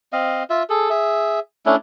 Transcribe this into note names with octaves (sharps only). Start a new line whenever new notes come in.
C4 D#5 F5
F4 E5
G#4 A4
G#4 E5
A3 C#4 D4 E4